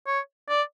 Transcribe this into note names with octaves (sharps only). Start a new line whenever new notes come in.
C#5
D5